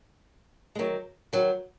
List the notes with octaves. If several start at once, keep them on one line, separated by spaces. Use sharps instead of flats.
G#3
D#3 F#3
D#3 F#3